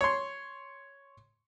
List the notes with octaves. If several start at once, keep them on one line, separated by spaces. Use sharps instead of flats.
C#5 C6